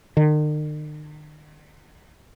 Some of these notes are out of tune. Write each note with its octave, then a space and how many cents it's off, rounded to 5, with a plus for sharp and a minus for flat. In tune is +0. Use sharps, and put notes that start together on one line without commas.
D#3 -45